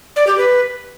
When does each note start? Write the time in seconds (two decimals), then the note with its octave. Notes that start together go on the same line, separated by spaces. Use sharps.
0.16 D5
0.27 G4
0.38 B4